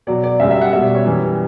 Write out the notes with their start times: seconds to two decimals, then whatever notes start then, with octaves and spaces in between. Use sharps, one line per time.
0.07 B2 F#3 D5
0.24 D5
0.40 F#2 C#3 G3 E5
0.51 E5
0.61 F#5
0.73 B2 G3 E5
0.83 D5
0.95 C#5
1.05 F#2 E3 G3